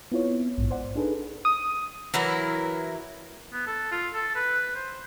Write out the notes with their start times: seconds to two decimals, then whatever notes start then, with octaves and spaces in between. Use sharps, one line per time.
0.12 B3 C4 E4 F4 C#5
0.58 A#1 G#2
0.71 C5 D5 F#5
0.96 D4 D#4 G#4 A4 B4
1.45 D#6
2.14 E3 F#3 E4 A#4
3.53 B3
3.67 A4
3.92 F4
4.14 A4
4.35 B4
4.76 C5